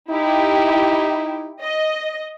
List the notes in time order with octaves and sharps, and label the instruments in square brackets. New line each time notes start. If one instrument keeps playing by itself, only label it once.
[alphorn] D#4 [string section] E4 G4
[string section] D#5